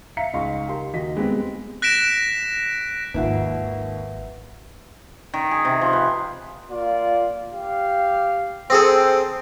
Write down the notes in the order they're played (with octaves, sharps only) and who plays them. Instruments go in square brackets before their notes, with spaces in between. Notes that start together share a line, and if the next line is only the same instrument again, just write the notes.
[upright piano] E5 F5 A#5 B6 C#7
C#2 D#4 D#5 F5 C6 C#6
G4 A#4 C6
D#2 D#4 F#4 D#5 B6
G#3 B3 C4 G4
[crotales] F#6 A#6 B6 D7 E7
[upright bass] D#1 G#1 [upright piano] D#2 F3 [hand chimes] B4 E5 F#5
[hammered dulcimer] D#3
G#4
C3
F3
B4
[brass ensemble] A#3 F4 D5
G4 F5
[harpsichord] C4 G#4 A4 [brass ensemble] C5 G5